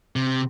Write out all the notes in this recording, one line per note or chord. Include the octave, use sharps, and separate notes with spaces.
C3